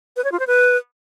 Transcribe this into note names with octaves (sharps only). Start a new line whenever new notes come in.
B4
C#5
F4
C5
B4